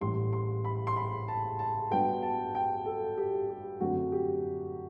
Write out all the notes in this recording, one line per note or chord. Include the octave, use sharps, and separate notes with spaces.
A1 A2 G3 C6
C6
B5
C6
B5
A5
A5
G2 F#3 B3 G5
A5
G5
A4
G4
G4
F#2 D3 F#3 A3 C4 F#4
G4